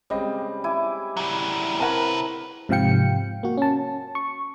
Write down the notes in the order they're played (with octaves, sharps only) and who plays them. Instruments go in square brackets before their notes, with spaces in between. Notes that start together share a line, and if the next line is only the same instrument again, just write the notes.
[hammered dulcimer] C#3 G3 [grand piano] G#3 C4 D#5
[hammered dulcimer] E4 G#5 D6
[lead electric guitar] F#3 G3
[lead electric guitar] C3 B4 [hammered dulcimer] C4 A#4 C#5 [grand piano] F#5 A5
[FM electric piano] G#2 C3 F3 F5 G5 C#7
A#3 F#4
C#4 A5
C#6